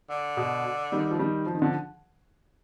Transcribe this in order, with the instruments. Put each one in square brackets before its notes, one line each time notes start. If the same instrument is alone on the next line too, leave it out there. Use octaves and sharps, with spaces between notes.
[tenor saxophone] D3
[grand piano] B2
D#3 G3
F3
D#3 G3
F3
D#3
D3 F3